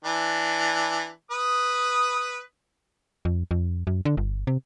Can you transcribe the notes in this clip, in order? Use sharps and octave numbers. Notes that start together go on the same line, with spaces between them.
E3 D4
B4 D#6
F2
F2
F#2
D3
G1
C3